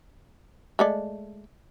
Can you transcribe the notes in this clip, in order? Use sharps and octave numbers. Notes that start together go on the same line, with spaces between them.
G#3 A3 D5